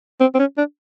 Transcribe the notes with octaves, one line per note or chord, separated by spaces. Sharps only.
C4
C4
C#4
D4